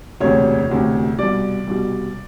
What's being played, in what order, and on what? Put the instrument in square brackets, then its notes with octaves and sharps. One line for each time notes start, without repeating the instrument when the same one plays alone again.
[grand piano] E1 D2 C3 C#5
E1 D2 C3
C2 B2 G3 D5
C2 B2 G3